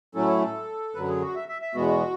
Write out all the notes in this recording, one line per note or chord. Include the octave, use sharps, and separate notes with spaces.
A2 F#3 A3 C#4 E4 A4
F#2 D3 F#3 B4
G#4
F#4
E5
E5
E5
E2 B2 G#3 B3 F#4